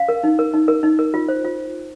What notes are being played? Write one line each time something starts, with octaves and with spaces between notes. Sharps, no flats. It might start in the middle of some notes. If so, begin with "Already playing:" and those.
Already playing: F5
A#4
D#4
A#4
D#4
A#4
D#4
A#4
F4
C5
F4